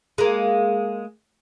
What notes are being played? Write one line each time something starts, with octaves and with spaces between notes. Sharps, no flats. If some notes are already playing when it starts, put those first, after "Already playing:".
G#3 A#3